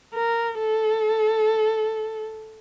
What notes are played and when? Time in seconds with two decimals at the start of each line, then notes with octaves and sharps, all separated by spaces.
0.14 A#4
0.59 A4